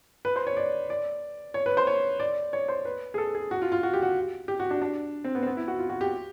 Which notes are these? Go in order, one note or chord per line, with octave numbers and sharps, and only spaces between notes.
B4
C5
C#5
D5
D5
C#5
B4
C5
C#5
D5
C#5
C5
B4
G#4
A4
G#4
F#4
F4
F4
F#4
G4
F#4
G4
F#4
D4
D4
C4
B3
C4
B3
E4
F#4
F4
F#4
G4